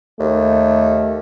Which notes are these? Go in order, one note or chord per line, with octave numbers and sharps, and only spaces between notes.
D#2 A3